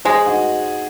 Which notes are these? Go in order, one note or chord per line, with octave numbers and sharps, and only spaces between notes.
G#3 G#4 C5
D#4 F#4